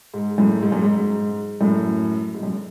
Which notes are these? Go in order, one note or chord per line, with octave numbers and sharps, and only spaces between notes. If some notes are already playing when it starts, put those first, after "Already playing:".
G#2
F#2 A2
G#2
F#2
G#2
F#2 A2
G#2
F#2